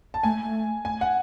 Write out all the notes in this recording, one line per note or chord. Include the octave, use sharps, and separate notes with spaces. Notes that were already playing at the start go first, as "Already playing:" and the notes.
A5
A3 G#5
A3
G#5
F#5